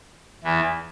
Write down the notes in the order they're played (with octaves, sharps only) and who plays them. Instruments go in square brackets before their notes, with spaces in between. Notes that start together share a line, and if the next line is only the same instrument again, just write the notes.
[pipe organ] E2 E3